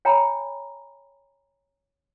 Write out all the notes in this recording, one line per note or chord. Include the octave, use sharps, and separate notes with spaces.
C#5 G5 G#5 A#5 B5